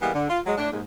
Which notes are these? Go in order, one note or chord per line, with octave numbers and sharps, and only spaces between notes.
E3 G3 G#3 A#3 B3
D3
F4
F#3 G#3
A2 D4
D#2 G#2